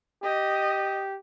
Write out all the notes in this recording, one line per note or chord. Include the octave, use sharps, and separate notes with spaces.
G4 D#5